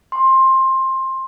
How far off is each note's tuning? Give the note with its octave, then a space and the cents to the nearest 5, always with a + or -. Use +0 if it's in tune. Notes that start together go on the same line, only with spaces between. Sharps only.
C6 +15